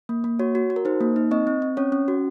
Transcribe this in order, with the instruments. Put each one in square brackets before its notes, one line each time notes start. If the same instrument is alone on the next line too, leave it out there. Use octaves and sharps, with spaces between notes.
[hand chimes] A#3
A#3
F#4 C#5
F#4
F#4
A#4
D#4 C5
A#3
D#4
C4 D#5
C4
C4
C#4 C#5
C#4
F#4